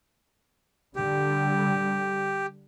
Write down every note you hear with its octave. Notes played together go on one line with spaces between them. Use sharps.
D3 G3 G4